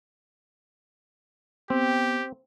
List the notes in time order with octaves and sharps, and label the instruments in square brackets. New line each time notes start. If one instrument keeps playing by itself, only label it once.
[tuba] B3 [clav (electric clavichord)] C4 [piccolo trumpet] G4